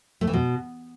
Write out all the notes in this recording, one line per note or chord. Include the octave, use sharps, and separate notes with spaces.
A3
E3
B2